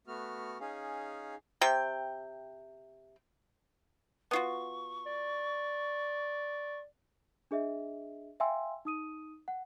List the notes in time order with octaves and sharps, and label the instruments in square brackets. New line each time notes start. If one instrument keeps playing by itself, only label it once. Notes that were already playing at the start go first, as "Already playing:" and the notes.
[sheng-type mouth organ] A3 B3 F#4 F6
C#4 D#4 G#4 F5
[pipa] C3 G5
[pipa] B3 F4 F#4 [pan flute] C#6
[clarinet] D5
[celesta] D4 G#4 D#5 E5
E5 F5 G5 G#5 C6 E6
D#4 D#6 D#7
F#5